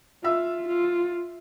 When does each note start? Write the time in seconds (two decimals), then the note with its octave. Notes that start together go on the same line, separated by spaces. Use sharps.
0.24 F4 E5 E6
0.69 F4